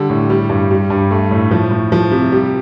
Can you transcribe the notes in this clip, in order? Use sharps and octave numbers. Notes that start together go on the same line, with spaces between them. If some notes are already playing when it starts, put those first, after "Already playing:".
Already playing: D3 G3
A2
G3
G2
G3
G2
A3
A2
F3
A2
F3
C3
G3